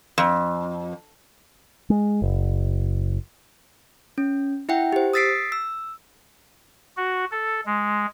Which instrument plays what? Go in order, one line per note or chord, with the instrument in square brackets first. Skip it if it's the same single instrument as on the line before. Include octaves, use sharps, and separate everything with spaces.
[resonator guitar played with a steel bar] F2
[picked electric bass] G#3
F#1
[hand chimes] C#4
E4 E5 F#5 G5
G4 C5
D#6 E6 A6 B6 C7 D7
E6
[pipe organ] F#4
A4
G#3